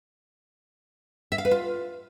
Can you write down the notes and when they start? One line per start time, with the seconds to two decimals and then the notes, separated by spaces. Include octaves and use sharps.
1.32 E5
1.38 F5
1.45 B4
1.51 F4